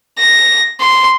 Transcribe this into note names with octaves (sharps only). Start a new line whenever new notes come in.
A#6
C6